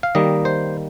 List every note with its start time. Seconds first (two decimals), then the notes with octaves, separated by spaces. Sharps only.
0.03 F5
0.15 D#3 G3 A#3 D#5
0.45 C5